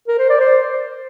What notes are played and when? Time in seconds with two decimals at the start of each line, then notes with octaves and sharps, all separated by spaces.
0.08 A#4
0.19 C5
0.29 D5
0.40 C5